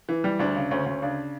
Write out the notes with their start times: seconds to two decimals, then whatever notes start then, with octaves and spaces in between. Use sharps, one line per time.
0.09 E3
0.24 G3
0.39 D2 D4
0.56 C#3
0.71 D2 C#4
0.86 D2
1.02 C#3 D4